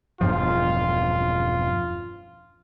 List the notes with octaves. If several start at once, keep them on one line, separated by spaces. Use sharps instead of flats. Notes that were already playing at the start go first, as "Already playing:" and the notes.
E1 G2 F3 F4